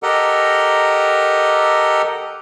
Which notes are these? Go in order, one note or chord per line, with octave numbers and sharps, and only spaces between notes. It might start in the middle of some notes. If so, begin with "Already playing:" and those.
G4 A4 A#4 D#5 F#5 A#5